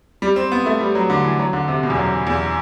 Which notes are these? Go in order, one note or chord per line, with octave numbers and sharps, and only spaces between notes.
G3
C4
B3
A3
G3
F#3
D3
E3
F#3
D3
C3
B2
E2
F#2
E2